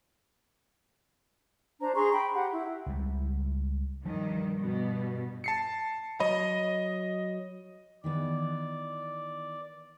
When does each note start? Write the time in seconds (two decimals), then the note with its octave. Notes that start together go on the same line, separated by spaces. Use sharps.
1.81 D4 C5 A#5
1.96 G#4 A#5 C6 C#6
2.12 G5 B5
2.35 G4 F#5
2.52 E4
2.86 C#2 G3
4.06 G2 D#3 F3 G3
4.59 G2 B2
5.44 A5 C7 C#7
6.20 F#3 C#5 D#5 B5
8.04 D#3 E3 B3 D5